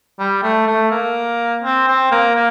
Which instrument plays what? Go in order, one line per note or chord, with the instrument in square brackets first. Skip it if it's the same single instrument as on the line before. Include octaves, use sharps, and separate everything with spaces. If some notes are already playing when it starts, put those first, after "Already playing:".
[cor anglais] G3
A3
A3
A#3
C4
C4
A#3
A#3